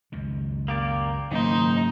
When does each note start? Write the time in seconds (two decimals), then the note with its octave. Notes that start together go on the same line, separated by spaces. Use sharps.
0.12 C#2 F#2 D#3
0.68 A#3 G4 D5
1.32 F#1 G#2 D#3 D#4 C5